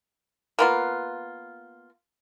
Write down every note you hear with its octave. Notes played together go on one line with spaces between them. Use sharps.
A#3 B3 F4